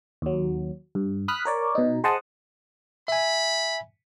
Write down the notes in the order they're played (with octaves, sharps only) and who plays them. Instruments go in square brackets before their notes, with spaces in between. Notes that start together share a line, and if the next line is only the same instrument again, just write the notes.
[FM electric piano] D#2 F#3
G2
B5 D#6 F6 F#6 B6
A#4 C#5 D5
B2 D#4
G#4 C5 D#5 F#5 A5 D#6
[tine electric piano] E5 G#5 [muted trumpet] B5